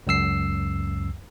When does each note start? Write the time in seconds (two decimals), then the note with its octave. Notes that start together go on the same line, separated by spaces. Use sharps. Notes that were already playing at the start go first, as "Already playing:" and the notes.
0.07 C#2 F#2 E6 C7